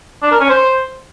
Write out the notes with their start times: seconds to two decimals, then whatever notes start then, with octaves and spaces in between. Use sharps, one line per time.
0.22 D4
0.31 A#4
0.40 C#4
0.49 C5